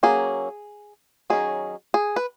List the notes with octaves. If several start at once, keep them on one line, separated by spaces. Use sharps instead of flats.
F#3 A#3 C#4 G#4
D#3 F#3 C#4 G#4
G#4
B4